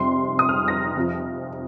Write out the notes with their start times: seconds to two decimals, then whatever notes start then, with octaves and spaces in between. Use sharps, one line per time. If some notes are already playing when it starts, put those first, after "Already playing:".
Already playing: F2 C3 G3 C6
0.39 D#6
0.49 F6
0.68 A#6
0.97 F2 C3 F3